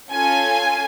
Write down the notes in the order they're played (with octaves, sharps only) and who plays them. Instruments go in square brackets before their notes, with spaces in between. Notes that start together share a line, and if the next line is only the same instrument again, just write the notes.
[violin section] C#4 F4 A4 G#5